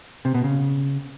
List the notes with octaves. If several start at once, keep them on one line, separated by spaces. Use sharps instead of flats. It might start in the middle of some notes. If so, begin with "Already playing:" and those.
C3
B2
C#3